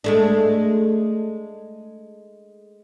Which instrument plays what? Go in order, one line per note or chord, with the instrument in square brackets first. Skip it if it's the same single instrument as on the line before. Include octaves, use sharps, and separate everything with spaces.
[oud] G#3 A3 D4